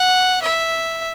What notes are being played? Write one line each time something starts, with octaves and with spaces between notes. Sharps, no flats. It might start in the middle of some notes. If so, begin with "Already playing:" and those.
Already playing: F#5
E5